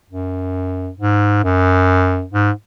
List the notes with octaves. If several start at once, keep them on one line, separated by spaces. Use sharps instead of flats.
F#2
G#2
F#2
G#2